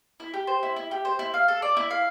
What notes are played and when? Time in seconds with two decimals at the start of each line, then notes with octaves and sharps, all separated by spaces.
0.20 E4
0.34 G4
0.47 C5
0.63 E4
0.76 E4
0.91 G4
1.05 C5
1.19 E4
1.34 F5
1.48 A4
1.62 D5
1.77 E4
1.90 F5